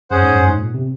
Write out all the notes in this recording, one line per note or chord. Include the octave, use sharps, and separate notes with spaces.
F#2 C#4 G#4 C5 F#5
G#2
F#2
G#2
A#2
C3